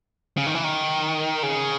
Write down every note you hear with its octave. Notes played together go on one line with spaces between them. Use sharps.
C#3
D#3
E3
D#3
C#3